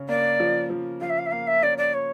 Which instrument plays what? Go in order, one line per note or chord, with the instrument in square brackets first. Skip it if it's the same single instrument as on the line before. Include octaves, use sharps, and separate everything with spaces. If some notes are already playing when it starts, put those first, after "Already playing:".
Already playing: [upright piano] C#3 C#4
[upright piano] A#3 [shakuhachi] D5
[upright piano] F3
F3
[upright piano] F3 [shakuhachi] F5
[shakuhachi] E5
F5
E5
[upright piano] A#3 [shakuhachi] F5
[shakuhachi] E5
[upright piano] C#4 [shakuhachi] D5
[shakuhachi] D5
C#5